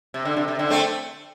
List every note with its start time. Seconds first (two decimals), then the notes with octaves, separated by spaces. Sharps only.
0.14 C3
0.25 D3
0.37 C3
0.48 C3
0.59 D3
0.70 A3 C4